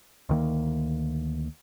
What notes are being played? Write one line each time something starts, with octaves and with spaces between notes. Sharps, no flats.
D2 D#3 A#3